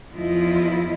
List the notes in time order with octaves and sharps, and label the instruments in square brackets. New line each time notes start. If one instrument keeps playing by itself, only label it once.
[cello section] E2 F3 E4 F4 D#5